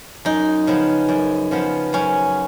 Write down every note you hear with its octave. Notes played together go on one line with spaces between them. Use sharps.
F#2 D#4
C#3 F3 B3
F#2
C#3 F3 B3
F#2 C#4